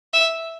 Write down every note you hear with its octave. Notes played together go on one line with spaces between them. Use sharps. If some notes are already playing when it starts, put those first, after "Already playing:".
E5